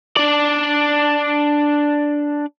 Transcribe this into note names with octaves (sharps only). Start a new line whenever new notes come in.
D4 D5